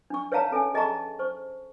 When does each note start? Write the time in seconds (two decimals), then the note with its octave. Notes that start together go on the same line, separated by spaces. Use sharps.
0.10 D4 C#6
0.32 B4 C#5 E5 F5 A5 A#5
0.51 C#4 A4 E5 G#5
0.74 G#4 D#5 E5 A5 A#5 C#6
1.19 C5 C#6